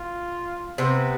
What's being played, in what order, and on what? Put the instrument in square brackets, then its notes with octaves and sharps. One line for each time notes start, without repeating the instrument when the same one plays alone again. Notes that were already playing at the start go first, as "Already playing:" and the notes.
Already playing: [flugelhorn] F4
[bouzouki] C3 C4 [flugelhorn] B3